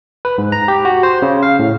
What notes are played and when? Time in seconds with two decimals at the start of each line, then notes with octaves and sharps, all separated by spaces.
0.25 B4
0.38 G#2
0.52 A#5
0.68 G4
0.85 F#4
1.03 C5
1.22 C#3
1.43 F5
1.59 A2